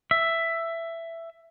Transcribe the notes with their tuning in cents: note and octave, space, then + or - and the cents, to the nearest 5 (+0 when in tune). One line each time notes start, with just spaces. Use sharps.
E5 +10